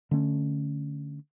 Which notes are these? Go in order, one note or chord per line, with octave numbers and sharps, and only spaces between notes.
D3 A3 C#4